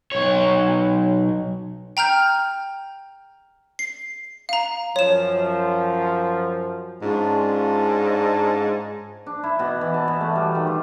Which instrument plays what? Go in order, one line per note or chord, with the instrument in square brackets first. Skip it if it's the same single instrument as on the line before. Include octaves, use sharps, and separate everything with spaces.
[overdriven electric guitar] B1 C#5
[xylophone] G5 A#5 F6 G6
C7
F5 A#5
[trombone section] F#2 F3 [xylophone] C#5 E7
[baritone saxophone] G#2 [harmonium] C#4 D4 F4
[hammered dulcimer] D4
E4
B2
E3
A5
B2
A3
G3
D#3
F4